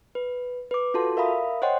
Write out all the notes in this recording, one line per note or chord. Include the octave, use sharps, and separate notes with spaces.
B4
B4 D6
F4 F#4 A4 A5 C6
A#4 E5 F5 B5 D#6
C5 C#5 D#5 F#5 G5 C6